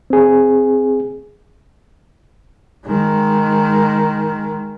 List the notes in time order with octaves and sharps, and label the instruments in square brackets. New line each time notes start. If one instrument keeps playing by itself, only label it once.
[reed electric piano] C4 G#4
[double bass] D#3 G#3